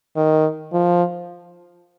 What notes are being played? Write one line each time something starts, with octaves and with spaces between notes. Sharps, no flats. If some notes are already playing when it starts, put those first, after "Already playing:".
D#3
F3